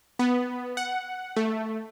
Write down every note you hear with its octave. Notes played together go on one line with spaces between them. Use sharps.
B3
F#5
A3